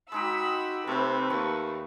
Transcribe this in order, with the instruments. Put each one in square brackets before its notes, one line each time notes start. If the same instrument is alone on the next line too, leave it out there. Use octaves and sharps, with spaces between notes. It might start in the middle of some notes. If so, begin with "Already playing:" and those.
[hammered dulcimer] G#3 D#4 G4 [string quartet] F#4 B5 E6
[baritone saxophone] C3 [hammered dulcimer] A3 C4 [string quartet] B4
[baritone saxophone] D#2 [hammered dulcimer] C#6